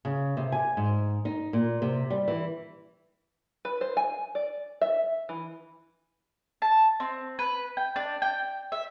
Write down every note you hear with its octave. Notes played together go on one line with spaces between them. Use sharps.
C#3
C3
G#5
G#2
D#4
A#2
C3
G3
E3
B4
C5
G#5
D5
E5
E3
A5
C4
B4
G5
D4
G5
E5